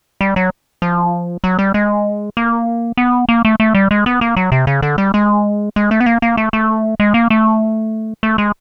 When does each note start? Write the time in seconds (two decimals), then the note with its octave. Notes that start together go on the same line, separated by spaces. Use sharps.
0.21 G3
0.36 F#3
0.82 F3
1.44 F#3
1.59 G3
1.74 G#3
2.37 A#3
2.97 B3
3.29 A#3
3.45 A3
3.60 A3
3.75 G3
3.91 G#3
4.06 B3
4.21 A#3
4.37 F#3
4.52 C3
4.67 C#3
4.82 D3
4.98 G3
5.14 G#3
5.76 G#3
5.91 A3
6.00 B3
6.06 A#3
6.22 A#3
6.37 A3
6.53 A3
7.00 G#3
7.14 A#3
7.30 A3
8.23 A3
8.38 G#3